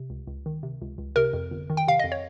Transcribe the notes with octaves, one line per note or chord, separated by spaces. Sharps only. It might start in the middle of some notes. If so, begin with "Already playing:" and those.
Already playing: C3
C#2
C#2
D#3
C3
C#2
C#2
C3 A#4
F2
G1
D#3
G5
C3 F5
F2 D#5
C#5